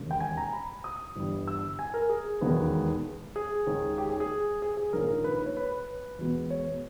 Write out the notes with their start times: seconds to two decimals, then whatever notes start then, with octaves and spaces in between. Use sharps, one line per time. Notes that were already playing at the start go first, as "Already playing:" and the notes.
Already playing: E1 D#2 C#3
0.11 G5
0.20 G#5
0.37 A#5
0.53 B5
0.84 D#6
1.16 G1 G2 E3 G3
1.48 E6
1.79 G#5
1.94 A#4
2.10 G#4
2.41 E1 D#2 D#3 G#3 B3
3.36 G#4
3.67 D#2 D#3 G#3 C#4
3.98 G4
4.09 G#4
4.20 G#4
4.62 G#4
4.77 G#4
4.93 A#1 G#2 D#3 A#3 C#4 A#4
5.09 A#4
5.24 B4
5.34 B4
5.46 C#5
5.57 B4
5.72 B4
6.19 E2 B2 G#3 B3
6.50 C#5